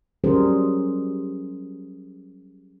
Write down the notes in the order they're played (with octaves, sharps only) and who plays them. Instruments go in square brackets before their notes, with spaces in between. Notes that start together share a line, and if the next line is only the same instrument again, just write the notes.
[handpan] F#3 G3 C#4 G#4 A#4 C5